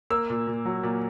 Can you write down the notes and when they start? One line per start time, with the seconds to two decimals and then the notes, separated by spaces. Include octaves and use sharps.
0.10 A#3 E6
0.30 A#2
0.47 A#2
0.65 F#3
0.83 A#2